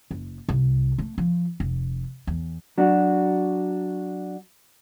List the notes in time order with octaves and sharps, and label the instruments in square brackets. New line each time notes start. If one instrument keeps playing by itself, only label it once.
[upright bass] F#1
C2
A3
F3
F1
E2
[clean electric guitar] F#3 D4 F#4